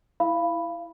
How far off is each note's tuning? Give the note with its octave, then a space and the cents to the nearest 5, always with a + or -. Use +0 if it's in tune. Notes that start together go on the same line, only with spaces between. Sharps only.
E4 +0 F5 -25 B5 +0